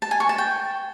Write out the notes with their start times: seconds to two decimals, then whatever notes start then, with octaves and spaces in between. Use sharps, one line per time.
0.02 A5
0.11 G#5
0.20 C#6
0.29 A5
0.38 G5